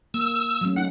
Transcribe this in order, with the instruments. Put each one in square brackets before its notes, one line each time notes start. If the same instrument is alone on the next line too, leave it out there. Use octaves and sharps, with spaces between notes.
[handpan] A#3 [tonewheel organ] E6
[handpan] F#3 A3 C#4
[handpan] F#3 D#4 [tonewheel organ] F#5